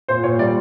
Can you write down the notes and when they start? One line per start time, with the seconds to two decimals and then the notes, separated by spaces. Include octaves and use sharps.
0.08 A#2 C5
0.23 A#2 C#5
0.39 G3 D5